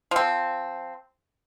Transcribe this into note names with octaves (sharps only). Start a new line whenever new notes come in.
F3 C4